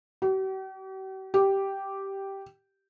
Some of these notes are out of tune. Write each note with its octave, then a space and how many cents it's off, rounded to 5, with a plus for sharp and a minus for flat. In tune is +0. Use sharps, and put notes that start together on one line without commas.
G4 -45
G4 -5